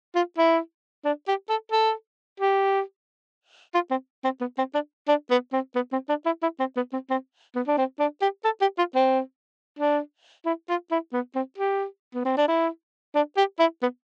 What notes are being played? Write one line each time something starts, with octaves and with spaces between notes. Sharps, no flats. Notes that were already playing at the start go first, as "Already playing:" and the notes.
F4
E4
D4
G4
A4
A4
G4
F4
C4
C4
B3
C4
D4
D4
B3
C4
B3
C4
D4
E4
E4
C4
B3
C4
C4
B3
D4
C4
D4
G4
A4
G4
F4
C4
D4
E4
F4
E4
B3
C4
G4
B3
C4
D4
E4
D4
G4
E4
B3